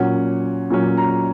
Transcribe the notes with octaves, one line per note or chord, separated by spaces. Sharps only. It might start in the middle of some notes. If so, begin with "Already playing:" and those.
Already playing: A#2 F#3 C#4 F#5
A#2 F#3 C#4
A#5